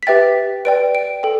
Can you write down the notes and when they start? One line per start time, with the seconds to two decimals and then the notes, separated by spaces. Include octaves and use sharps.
0.03 B6
0.07 G4 B4 E5 G5 A6
0.65 B4 D5 G5 D7
0.95 D7
1.23 A4 G5